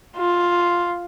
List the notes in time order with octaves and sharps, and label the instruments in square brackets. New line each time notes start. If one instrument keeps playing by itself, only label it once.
[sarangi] F4